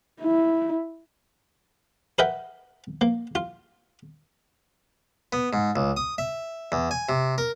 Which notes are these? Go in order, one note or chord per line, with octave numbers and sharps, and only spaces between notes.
E4
A#4 B4 D#5 E5 F#5 G5
A#3
F4
B3
G#2
C#2
D#6
E5
E2
G#5
C3
A#4